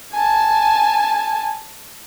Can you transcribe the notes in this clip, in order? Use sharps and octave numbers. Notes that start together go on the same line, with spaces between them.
G#5 A5